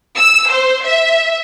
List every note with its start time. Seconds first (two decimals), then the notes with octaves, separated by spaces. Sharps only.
0.17 E6
0.50 C5
0.85 E5